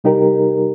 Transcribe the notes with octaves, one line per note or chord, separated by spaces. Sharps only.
C3 G3 D#4 G4 A#4